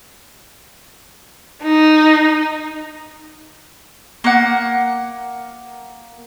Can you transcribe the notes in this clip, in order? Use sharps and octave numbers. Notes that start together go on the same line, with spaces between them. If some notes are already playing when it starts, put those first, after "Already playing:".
D#4
A#3 F#5